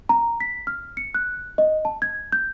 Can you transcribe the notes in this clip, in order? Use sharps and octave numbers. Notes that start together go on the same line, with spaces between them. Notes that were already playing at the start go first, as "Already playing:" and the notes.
A#5
B6
F6
C#7
F#6
D#5
A5
G#6
G6